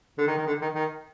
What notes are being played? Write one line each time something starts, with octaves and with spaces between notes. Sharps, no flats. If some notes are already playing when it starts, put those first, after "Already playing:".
D3
D#3
D#3
D3
D#3
D#3